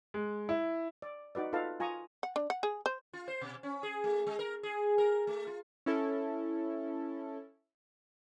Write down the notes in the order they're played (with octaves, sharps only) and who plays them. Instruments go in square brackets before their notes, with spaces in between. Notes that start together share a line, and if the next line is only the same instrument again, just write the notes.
[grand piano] G#3
E4
[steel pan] D5
D#4 F#4 B4 D5
D#4 F4 A4 B4 F5 A5
F4 G#5 A#5 C#6 D#6
[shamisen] F#5
D4
F#5
G#4
C5
[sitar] F4
C5
B2
C#4
G#4
A3
G#3
A#4
G#4
A#4
A3
F4
[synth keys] C#4 E4 A4